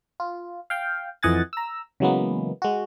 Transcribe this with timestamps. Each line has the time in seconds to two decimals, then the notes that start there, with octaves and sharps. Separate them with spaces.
0.20 F4
0.70 F5 G5
1.23 F2 E3 D#5 F#5 G#5 A6
1.53 A#5 E6
2.00 C#3 E3 F#3 G#3 A#3 B3
2.62 G#3 F#4